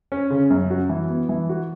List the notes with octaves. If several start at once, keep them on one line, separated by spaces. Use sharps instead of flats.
C#4
C#3
F#2
F#4
E3
B3
E3
F#4